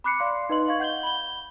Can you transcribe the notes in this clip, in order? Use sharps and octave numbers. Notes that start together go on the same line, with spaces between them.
B5 D6 F#6 C7 C#7
D5 F5 C6
D#4 B4 D#5 C6 F#7
D#5 F5 C#6 G#6
F#5 G6 F#7 G7
B5 G7